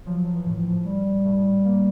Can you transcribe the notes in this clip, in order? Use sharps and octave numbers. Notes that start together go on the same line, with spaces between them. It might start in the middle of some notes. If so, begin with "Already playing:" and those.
F3 F#3
E3
A2
F3
A2 G3
A2
A#3